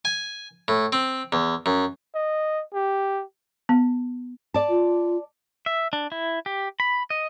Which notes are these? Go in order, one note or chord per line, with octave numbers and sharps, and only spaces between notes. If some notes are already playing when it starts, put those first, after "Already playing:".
G#5
A2
C4
E2
F#2
D#5
G4
B3
D5 A5
F4
E5
D4
E4
G4
B5
D#5